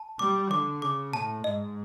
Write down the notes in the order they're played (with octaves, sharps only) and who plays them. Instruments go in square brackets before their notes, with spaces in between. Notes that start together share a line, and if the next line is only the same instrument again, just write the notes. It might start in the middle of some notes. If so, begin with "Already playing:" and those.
Already playing: [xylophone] A5
[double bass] G3 [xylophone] D6
[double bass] D3 [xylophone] D6
[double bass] C#3 [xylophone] D6
[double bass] A2 [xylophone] A5
[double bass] G#2 [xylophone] D#5